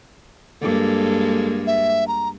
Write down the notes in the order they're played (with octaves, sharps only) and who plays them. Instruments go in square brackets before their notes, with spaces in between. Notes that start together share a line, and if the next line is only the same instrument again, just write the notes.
[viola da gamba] G2 G#3 A#3 [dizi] A4
[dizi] E5
A#5